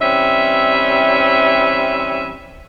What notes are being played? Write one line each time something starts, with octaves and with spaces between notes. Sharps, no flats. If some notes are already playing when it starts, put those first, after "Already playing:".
E3 G3 C4 C#4 E5